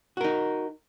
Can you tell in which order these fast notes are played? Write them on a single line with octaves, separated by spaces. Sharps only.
F#4 A#4 D#4